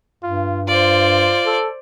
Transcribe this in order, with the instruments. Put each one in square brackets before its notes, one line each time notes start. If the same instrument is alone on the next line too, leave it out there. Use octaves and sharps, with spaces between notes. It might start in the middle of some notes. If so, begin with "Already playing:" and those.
[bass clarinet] G2 [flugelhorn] F4
[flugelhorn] F4 [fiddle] C5 D5
[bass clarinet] A4